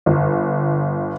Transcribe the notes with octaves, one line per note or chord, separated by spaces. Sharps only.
G1